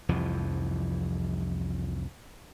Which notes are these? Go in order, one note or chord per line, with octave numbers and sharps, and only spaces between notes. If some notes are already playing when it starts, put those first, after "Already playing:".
C2 F2 E3 F3